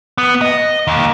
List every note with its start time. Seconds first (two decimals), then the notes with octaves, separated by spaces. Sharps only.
0.18 B3
0.41 D#5
0.87 D#2